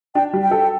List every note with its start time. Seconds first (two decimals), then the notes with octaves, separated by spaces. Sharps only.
0.15 D4 G5
0.33 G3
0.42 G5
0.51 A4